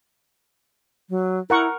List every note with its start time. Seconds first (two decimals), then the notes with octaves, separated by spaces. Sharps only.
1.10 F#3
1.50 E4 A#4 F#5 C#6